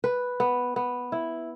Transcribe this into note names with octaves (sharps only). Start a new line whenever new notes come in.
B4
B3
B3
E4